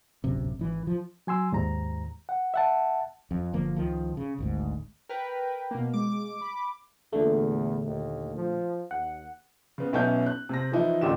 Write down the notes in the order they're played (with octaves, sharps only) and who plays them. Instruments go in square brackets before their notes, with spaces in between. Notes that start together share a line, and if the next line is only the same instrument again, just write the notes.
[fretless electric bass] D1 G1 F#2 C3
G#1 E3
F3
[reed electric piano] F#3 G#5 C6 E6
D#2 G#2 A#5
F#5
E5 F#5 A5
[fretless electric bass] F2
G1 D3 F3 A#3
C#2 D#3 F3
C#3
G#1 D2 G#2
[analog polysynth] A#4 B4 [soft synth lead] G5
[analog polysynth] B2 A#3
[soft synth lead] G#3 [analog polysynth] D6
[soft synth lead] B5
[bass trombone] E2 [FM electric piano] A#2 D3 A3
[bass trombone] D#2
F3
[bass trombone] D#2 [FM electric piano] F#5
[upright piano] C#3 B3
B1 B3 C#4 E4 G6
F#6
C3 A#6
E3 F3 D#4 E4
A1 D2 A#2 G4 E7